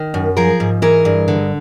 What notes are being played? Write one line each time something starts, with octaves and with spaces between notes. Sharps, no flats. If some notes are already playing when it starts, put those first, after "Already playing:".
Already playing: D#3
F#2
F3 G#4 A#4
G#2
E3 G#4 A#4
G2
D3